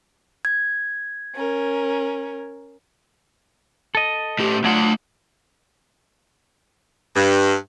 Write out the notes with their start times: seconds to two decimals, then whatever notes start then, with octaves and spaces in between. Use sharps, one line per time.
0.45 G#6
1.36 C#4 A#4
3.95 A4 D#5
4.39 A2 G4
4.64 F#3 A3 D4 F4 F#5
7.16 G2